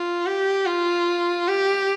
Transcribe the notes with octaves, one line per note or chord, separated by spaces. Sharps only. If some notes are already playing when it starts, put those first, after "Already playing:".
Already playing: F4
G4
F4
G4